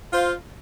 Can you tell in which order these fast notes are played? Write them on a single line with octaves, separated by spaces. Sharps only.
F4 C5 F5